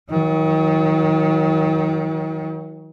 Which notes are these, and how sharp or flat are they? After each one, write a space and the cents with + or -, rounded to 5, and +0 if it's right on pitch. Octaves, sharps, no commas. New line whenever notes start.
D#3 +35 F#3 -10